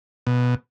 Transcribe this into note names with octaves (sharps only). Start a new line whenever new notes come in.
B2